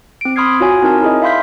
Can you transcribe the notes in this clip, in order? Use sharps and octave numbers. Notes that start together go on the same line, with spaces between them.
C4 D7
B5 C6 D#6 F6 G#6 C7
F4 F#4 C#5 G#5
C4 D#4 E4 A#4 G#5 A5
E4 G#4 D#5
E5 F5 B5 C6 G6 B6